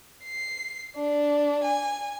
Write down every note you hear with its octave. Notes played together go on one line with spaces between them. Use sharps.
C7
D4
G#5